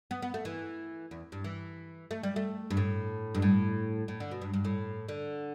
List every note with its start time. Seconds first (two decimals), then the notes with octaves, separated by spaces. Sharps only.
0.11 B3
0.22 B3
0.34 A3
0.45 E3
1.11 E2
1.32 G2
1.44 E3
2.11 A3
2.23 G3
2.36 A3
2.71 G2
2.77 A2
3.35 G2
3.42 A2
4.08 A2
4.20 D3
4.31 B2
4.42 G2
4.54 G2
4.65 A2
5.09 D3